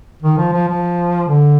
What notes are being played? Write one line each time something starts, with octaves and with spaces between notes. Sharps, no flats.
D#3
F3
F3
F3
D3